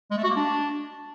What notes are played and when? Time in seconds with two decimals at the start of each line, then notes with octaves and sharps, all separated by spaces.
0.11 G#3
0.17 A3
0.23 F#4
0.30 A#3
0.36 D4